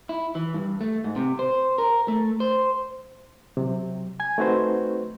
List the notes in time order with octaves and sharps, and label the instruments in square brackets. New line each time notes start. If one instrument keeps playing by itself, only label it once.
[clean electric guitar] E4
E3
G2
A3
G#2
C3
C5
A#4
A3
C5
[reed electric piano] C3 F#3
G#5 G#6
A3 C4 D#4 F#4 B4 C5